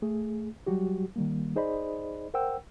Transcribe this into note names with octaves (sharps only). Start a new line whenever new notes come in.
A3 G#4
F#3 G3 F#4 G4
D#3 G3 A#3
D#4 G#4 C5 D5 D#5 B5
A#4 C5 F#5 G5 E6